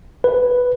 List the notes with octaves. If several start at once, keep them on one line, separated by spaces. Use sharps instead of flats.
B4